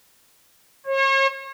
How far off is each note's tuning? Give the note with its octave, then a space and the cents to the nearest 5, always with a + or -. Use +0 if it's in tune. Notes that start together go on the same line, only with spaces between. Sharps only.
C#5 -40